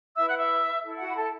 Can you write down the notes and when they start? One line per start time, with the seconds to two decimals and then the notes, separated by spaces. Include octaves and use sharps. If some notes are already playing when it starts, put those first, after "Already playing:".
0.16 E4 B4 E5 E6
0.28 F#5 F#6
0.38 E5 E6
0.83 E4 A4
1.00 F#4 F#5
1.08 B5
1.16 A4 A5